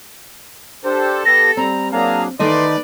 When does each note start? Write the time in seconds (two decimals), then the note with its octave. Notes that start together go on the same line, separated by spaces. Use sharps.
0.85 D4 G4 A4 C5
1.26 B3 G4 A#6
1.57 G3 C4 A#5
1.92 F#3 A#3 D4 G#4 F5 A#5
2.39 D#3 E3 A3 B4 D5 D#5 C6